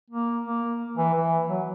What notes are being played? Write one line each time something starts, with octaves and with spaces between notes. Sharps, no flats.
A#3
A#3
E3
E3
F#3